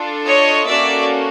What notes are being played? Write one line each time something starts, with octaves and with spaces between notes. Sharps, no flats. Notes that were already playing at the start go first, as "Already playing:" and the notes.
Already playing: D4 F4 A4
C#5 D#5
A#3 C#4 F#4 A4 D5 E5